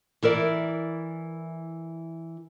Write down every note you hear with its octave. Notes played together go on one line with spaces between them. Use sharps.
E3 E4 A#4 D5